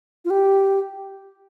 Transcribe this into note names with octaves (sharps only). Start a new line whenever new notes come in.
F4
G4